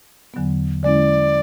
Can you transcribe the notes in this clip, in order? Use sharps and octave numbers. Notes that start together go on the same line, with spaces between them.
E2 D3 F#3 B3
D3 G#3 C#4 E4 D5